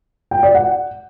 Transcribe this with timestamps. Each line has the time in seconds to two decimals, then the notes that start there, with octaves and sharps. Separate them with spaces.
0.31 G5
0.43 D5
0.55 F#5